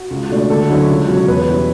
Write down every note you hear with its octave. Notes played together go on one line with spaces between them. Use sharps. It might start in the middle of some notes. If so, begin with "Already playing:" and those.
Already playing: F#4
C#2
B2 A3 D4
D2 A4
D3 F#3 C#4 E4
C#2
B2 F#3 C#4
E2 B4
B2 G3 C#4 E4